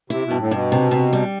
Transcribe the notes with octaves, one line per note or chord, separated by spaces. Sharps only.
C3 E4
B2
G2
A2
G2 B2
C3
C3
G3